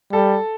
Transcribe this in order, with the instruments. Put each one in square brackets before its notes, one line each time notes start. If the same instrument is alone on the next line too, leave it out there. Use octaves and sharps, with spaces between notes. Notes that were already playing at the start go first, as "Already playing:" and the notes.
[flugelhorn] G3 [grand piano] A4